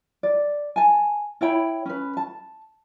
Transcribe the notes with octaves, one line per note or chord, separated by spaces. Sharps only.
D5
G#5 A5
E4 C#5 G5 B5
C#4 B4
A5